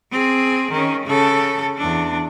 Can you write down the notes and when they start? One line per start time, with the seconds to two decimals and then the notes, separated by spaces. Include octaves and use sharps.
0.11 C4 G#4
0.71 D#3 C#4
1.06 C#3 A4
1.77 E2 D4